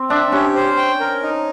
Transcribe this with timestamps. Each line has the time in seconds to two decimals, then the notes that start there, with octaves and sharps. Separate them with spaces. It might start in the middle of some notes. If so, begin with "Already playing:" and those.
Already playing: C4
0.10 D4 E5
0.32 C#4 G4
0.55 C5
0.77 G5
1.00 A#4
1.22 D#4